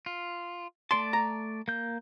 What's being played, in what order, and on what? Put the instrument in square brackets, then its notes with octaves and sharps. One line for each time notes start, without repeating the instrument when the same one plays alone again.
[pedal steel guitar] F4
[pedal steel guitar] A3 D5 A5 [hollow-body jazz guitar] C6
[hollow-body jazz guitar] A#5
[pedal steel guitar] A#3 G6